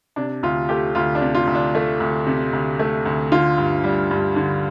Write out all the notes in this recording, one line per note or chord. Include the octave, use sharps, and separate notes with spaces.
C3 D4
D2 F4
A3 G4
D2 F4
D4
C3
F4
D2
D4
A3
D2
C3
D2
A3
D2
D3 F4
G2
G3
G2
D3